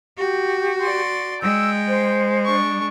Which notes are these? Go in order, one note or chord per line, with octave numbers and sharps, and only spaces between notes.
F#4 G4
D5 C6
G#3 G5 E6
C5
D4 C#6